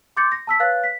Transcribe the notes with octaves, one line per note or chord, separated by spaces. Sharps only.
C6 D6 G6 A6 C#7
A#6
A5 E6 B6
B4 C#5 F5 F#6 A6
B6